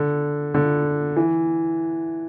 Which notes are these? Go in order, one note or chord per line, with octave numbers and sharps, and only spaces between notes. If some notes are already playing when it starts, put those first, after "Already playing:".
Already playing: D3
D3
E3